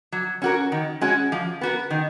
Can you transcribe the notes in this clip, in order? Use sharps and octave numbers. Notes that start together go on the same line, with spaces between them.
F#3
C#4 F#4 A#4
D#3
G#3 C#4 F#4
F3
B3 F#4 A#4
D#3